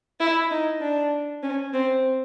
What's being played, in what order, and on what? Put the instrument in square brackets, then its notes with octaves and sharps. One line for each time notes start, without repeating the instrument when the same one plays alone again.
[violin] E4
D#4
D4
C#4
C4